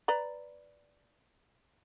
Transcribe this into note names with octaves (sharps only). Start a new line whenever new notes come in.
B4 D5 A#5